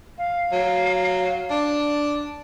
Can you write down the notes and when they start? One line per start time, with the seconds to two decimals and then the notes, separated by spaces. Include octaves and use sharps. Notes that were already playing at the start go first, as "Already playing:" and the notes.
0.18 F5
0.53 F#3
1.50 D4